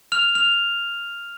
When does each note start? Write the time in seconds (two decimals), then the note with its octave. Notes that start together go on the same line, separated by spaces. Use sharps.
0.12 F6 F7
0.35 F6 F7